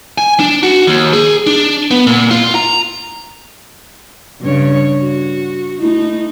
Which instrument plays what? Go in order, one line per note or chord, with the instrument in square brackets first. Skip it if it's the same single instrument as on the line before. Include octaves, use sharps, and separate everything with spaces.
[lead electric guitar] G#5
D4
F#4
D#2
G#4
D4
B3
A#2
F4
A#5
[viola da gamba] G2 C#3 C#5
F#4
[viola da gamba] A3 D#4 [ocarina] E4